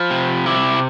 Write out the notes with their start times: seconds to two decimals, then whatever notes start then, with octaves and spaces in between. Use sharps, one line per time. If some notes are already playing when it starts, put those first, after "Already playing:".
Already playing: F3 B5
0.10 C3
0.46 E4 D6